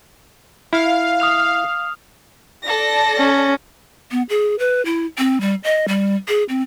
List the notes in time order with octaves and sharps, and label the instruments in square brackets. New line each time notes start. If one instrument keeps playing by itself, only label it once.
[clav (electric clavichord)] E4 [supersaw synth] F5
[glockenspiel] D#6 F6 F7
[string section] A4 D5 A#6
[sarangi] C#4
[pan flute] B3
G#4
B4
E4
C4
G3
D#5
G3
G#4
C4